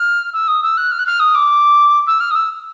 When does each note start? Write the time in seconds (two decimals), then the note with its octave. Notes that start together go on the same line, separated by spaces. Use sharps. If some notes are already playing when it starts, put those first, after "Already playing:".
Already playing: F6
0.33 E6
0.48 D#6
0.63 E6
0.77 F#6
0.91 F6
0.99 F#6
1.06 F6
1.20 D#6
1.35 D6
2.07 E6
2.20 F6
2.31 D#6
2.35 E6